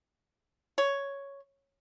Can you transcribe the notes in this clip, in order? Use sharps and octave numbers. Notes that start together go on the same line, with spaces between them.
C#5